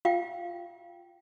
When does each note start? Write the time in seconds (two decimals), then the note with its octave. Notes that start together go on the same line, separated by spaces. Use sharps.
0.05 F4 F5 G5